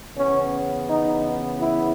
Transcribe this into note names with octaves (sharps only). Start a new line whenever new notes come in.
C#3 E3 B3 C#4
D#4
E4